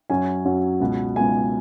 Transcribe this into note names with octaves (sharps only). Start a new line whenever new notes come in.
F#2 F#3 C#4 G#5
F#2 F#3 C#4
C#2 B2 B3
C#2 B2 B3 G#5